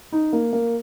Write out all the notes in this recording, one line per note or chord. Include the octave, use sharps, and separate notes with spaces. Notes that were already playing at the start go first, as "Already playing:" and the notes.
D#4
A#3
A#3